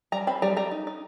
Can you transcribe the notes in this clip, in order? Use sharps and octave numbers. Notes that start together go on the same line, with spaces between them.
G3 A#5
C4 B5
G3 A#5
G3 A#5
D#4
D#4